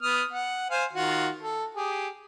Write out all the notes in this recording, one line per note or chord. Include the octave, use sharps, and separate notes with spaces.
B3 D#6 F6
F#5
C5 F5 G#5
D#3 F4 F#4
A4
G4 G#4